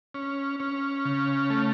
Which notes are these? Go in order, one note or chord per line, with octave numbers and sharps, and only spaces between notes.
C#4
C#4
C#3
A3